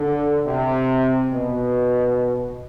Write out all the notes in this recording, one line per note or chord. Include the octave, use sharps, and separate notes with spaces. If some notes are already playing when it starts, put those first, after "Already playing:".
Already playing: D3
C3
B2